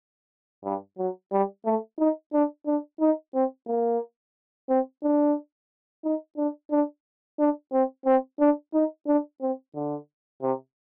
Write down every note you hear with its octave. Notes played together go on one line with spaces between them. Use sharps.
G2
F#3
G3
A3
D#4
D4
D4
D#4
C4
A#3
C4
D4
D#4
D4
D4
D4
C4
C4
D4
D#4
D4
C4
D3
C3